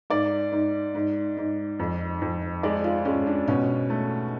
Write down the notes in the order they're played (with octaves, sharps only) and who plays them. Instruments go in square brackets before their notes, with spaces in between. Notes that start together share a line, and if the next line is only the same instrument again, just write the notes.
[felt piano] G#2 D5
G#2
G#2
G#2
F2
F2
G#3 D5
F4
G#3 C#4
D4
B2 C#4
A3